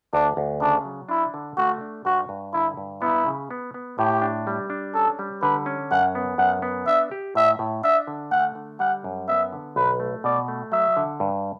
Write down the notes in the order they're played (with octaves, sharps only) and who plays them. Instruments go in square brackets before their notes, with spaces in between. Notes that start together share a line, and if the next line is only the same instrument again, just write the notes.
[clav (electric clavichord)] D2 [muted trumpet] D4
[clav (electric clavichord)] D2
[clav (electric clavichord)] C#3 [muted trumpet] D4
[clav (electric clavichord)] F#3
[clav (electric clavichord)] D4 [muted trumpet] E4
[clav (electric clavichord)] D3
[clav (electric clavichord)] A3 [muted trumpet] F#4
[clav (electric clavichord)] D4
[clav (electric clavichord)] G2 [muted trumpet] F#4
[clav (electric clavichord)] G2
[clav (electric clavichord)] D3 [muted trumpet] E4
[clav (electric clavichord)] G2
[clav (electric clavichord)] B3 [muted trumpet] E4
[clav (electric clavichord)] C#3
B3
B3
[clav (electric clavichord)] A2 [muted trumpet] G4
[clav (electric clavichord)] D4
G3
D4
[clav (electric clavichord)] C#4 [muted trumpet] A4
[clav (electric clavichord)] G3
[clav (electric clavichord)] D3 [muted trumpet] B4
[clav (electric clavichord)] C#4
[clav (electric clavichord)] F#2 [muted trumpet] F#5
[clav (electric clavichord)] B3
[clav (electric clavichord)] F#2 [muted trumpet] F#5
[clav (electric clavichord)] B3
[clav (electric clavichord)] D4 [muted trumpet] E5
[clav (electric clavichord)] G4
[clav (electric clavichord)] A2 [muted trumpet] E5
[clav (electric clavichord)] A2
[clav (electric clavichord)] D4 [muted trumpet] E5
[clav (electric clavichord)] D3
[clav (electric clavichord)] A3 [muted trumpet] F#5
[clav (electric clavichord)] D3
[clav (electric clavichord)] G3 [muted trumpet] F#5
[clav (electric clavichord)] F#2
[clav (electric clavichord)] B3 [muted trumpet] E5
[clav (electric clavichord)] D3
[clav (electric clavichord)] B1 [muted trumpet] B4
[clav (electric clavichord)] A3
[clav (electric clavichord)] B2 [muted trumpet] D5
[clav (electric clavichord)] A3
[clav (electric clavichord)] F#3 [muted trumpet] E5
[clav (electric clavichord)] D3
G2